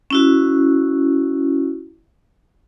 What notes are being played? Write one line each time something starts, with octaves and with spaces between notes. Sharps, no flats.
C#4 E4 F#4